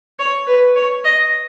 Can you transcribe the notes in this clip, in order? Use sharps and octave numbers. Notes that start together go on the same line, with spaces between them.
C#5
B4
C#5
D#5